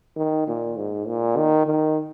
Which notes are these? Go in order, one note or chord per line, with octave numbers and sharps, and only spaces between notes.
D#3
A#2
G#2
A#2
D#3
D#3